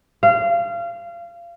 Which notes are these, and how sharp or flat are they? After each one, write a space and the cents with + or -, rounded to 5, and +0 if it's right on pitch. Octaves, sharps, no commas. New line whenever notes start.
F5 -25